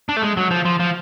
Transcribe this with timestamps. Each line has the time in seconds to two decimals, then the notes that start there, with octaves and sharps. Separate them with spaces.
0.09 D4
0.17 A3
0.22 G#3
0.37 F#3
0.51 F3
0.65 F3
0.80 F3